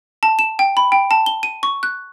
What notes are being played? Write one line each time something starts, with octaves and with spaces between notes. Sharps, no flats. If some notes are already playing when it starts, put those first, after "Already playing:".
A5
E7
G5
B5
G5
A5
G7
D#7
C#6
F#6